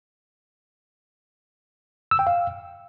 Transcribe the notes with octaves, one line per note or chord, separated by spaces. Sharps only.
E6
G5
F5